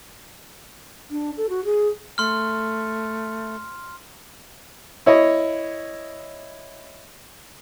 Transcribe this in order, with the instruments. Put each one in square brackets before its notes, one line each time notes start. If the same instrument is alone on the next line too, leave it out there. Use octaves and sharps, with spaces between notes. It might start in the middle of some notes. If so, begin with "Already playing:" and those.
[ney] D4
A4
F#4
G#4
[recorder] A3 [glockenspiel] C6 F6
[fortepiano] E4 C#5 D#5